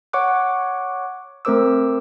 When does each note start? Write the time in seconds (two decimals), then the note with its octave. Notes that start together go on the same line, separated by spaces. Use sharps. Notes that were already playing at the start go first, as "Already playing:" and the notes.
0.13 C#5 F#5 C#6 D6 F#6
1.45 A3 C4 A#4 C5 D6 E6